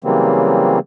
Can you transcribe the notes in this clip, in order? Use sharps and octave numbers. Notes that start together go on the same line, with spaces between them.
C#3 E3 F#3 G3 A#3 C4